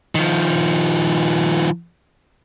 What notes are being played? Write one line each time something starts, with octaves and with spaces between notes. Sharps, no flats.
D#3 F3